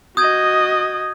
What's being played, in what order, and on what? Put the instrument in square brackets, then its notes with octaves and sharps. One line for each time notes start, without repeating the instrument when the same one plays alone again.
[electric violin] F#4 D#5 [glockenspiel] D#6 G6 G#6